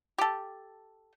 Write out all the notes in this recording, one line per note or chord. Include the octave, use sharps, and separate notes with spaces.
G4 A4